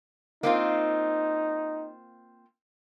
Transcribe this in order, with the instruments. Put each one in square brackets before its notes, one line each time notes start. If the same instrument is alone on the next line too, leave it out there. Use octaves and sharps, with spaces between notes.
[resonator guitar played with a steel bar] A#3 C4 F4 [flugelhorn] D#4